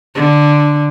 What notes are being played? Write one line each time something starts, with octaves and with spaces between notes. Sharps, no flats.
D3